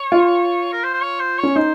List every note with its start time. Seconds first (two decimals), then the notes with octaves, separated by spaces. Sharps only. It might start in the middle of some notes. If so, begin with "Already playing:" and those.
Already playing: C#5
0.12 F4
0.73 A#4
0.83 C5
0.94 C5
1.02 C#5
1.20 C5
1.39 C#4 C#5
1.56 D#4 C5